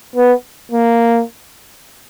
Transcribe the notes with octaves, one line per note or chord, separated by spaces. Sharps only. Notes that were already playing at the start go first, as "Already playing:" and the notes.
B3
A#3